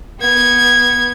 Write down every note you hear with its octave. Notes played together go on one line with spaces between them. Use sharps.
B3 G#6